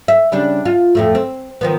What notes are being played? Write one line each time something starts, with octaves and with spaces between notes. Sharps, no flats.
E5
C#3 G3 D4
F4
F2 A2 A3
C4
D#3 F3 B3